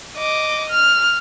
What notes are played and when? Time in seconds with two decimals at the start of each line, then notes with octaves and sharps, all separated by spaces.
0.17 D#5 D6
0.70 F6